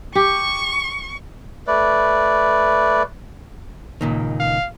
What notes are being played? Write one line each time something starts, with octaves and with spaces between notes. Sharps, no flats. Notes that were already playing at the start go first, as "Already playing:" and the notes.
G4 C#6
A3 B4 D5
C#2 A#2 D#3
F5